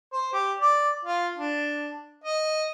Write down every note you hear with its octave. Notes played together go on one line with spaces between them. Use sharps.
C5
G4
D5
F4
D4
D#5